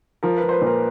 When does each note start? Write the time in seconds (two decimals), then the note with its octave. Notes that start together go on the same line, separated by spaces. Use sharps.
0.23 F3 A#4
0.38 B4
0.43 F3
0.49 C5
0.53 B4
0.62 A#2
0.67 A#4